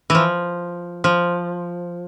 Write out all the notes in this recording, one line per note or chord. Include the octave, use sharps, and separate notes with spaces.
E3 F3
F3